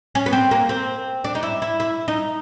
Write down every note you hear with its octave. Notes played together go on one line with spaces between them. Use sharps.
C#4
B3
C4
A#3
C4
D4
D#4
E4
E4
E4
D#4